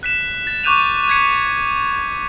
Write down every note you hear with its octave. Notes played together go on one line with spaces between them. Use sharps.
F#6 B6 E7
A6
C#6 D6 F#6 G6 D#7 F7
F#6 G#6 B6 C#7